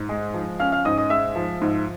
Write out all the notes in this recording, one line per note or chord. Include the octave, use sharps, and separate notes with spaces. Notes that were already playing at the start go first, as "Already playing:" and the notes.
Already playing: G#2
G#3
F3
C#4 F5 F6
F5 F6
G#2 D#5 D#6
D#5 D#6
G#3 E5 E6
F3
G#2